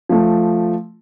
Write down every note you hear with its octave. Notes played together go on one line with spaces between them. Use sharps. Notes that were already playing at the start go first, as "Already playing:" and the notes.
F3 A3